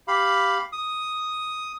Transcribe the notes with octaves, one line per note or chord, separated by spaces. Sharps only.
G4 F5 B5
D#6